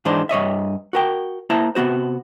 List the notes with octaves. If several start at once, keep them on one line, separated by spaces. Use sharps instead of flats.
G#2 E3 D4 D#4 C5
G2 C#5 D#5 E5
F#4 A#4 G5
A#3 E4 C5 A5 A#5
C3 D#3 B3 F#4 C5